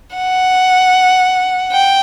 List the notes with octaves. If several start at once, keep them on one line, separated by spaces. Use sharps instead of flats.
F#5
G5